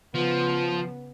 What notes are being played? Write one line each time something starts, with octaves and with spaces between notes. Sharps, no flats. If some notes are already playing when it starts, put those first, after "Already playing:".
C#3 F3 B3